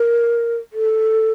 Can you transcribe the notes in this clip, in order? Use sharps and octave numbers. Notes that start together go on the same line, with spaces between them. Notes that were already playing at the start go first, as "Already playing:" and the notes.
Already playing: A#4
A4